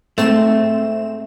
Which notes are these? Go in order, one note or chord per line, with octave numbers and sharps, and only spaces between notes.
G#2 A3 C4 E7